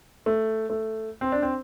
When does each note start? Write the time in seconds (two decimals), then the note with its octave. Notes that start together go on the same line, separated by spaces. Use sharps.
0.26 A3
0.70 A3
1.21 C4
1.32 D4
1.42 C4